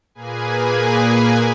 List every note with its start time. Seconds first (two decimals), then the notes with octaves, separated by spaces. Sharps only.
0.15 A#2 A#3 G#4 B4 G#5